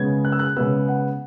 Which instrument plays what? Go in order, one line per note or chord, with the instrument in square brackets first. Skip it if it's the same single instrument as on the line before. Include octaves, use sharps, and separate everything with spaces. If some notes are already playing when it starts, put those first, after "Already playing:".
Already playing: [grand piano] C#3 G#3 B3 G#6
F#6
E6
F#6
C#3 G#3 B3 E6
F#5